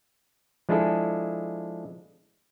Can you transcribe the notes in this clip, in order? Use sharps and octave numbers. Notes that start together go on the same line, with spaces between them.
F3 G#3 D4 E4 G#4 A4